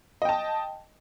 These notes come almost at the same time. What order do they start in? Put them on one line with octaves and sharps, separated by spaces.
D#5 G5 A5